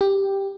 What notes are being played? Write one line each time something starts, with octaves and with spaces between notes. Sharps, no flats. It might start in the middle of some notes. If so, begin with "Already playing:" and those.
G4